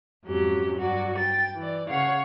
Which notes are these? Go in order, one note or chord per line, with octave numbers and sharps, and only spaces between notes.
F2 G#2 F#3 C#4 G4
G2 F#3 F#4 D5
G5 A6
E3 D5
C#3 C#5 F5 F#5